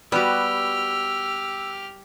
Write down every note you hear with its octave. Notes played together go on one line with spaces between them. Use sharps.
G3 B3 F#4 G4 E6 F6